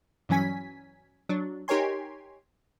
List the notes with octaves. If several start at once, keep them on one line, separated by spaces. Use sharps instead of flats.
G2 E3 F#3 C#4 G#5 B6
F#3 D4
D#4 G4 A#4 C#5 G#5 C6